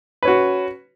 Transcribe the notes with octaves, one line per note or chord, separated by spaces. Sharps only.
C#4 F#4 B4